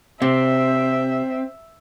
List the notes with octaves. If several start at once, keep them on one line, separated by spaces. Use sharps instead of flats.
C3 C4 E5